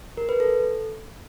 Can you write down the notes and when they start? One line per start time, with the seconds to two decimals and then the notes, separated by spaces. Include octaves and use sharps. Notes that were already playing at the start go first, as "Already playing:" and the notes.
0.17 A#4
0.29 B4
0.40 A4